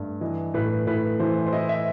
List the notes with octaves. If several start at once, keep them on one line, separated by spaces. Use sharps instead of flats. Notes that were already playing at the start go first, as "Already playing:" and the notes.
Already playing: G2 A3
E3 D#5
A2 B4
A2 B4
E3 C5
C5
E4 D#5
E5